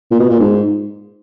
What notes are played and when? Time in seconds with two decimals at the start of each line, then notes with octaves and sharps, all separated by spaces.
0.11 A#2
0.20 B2
0.29 A#2
0.40 G#2